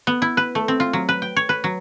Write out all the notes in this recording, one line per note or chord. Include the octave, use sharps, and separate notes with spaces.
B3
E4
B4
A3
C4
F4
F#3
B4
G5
C#5
B4
F#3